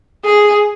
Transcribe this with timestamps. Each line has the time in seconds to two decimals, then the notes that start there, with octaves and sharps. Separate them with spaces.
0.25 G#4